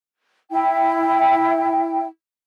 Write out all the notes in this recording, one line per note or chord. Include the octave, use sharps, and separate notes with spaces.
E4 G5